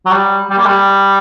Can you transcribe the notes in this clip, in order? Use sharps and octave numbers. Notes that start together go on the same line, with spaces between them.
F#3
G3
G3
A#3
G3